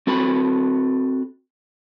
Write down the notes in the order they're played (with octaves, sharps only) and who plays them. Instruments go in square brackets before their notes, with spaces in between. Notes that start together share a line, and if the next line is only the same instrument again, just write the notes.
[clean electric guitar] C4 F#4 A4 B5